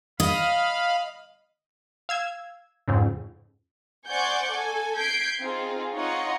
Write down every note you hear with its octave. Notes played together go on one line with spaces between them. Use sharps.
D#5 F5 B5
F5 E6 G#6
F2 G#2 C#3
C5 D5 F#5 G#5 C#6 G6
A4 G#5
G6 G#6 B6 C7 D7
C4 D#4 F4 G#4
D#4 F4 C#5 D#5 F#5